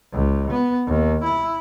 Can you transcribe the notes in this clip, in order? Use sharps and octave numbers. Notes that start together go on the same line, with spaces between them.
C#2
B3
D#2
E4